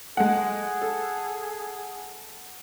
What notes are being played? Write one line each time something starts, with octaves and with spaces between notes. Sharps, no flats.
G#3 A3 G#4 F#5
A4